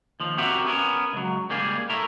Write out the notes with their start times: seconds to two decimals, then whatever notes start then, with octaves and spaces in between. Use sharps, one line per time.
0.20 D#2 F3
0.38 C4 F#4 G4 A#4 E5 F#5
0.66 B3 C#4 A#4
1.13 C#2 F#3
1.50 C#2 G3 A#3 G#4
1.90 A3 E4 A#4